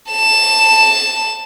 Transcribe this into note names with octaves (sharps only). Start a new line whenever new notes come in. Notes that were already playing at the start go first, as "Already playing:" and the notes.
A5 E7